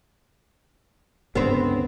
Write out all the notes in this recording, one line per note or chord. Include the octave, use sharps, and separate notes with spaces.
C#2 G2 D3 B3 C4